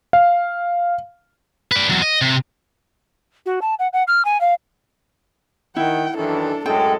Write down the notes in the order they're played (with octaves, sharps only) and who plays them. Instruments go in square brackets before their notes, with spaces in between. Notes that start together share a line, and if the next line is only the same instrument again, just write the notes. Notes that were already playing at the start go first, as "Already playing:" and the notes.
[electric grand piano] F5
[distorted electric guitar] B4 D5
E2 F#3
D#5
C3
[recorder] F#4
A5
F#5
F#5
F6
G#5
F5
[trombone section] D#3 [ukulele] E4 [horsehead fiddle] F#5 G5
[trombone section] F#2 D#3 E3 [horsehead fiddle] D4 A4
[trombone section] F#2 A2 G#3 [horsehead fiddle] A4 [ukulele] G5